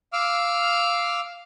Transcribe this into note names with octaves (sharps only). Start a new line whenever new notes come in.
F5 D6 E6 F6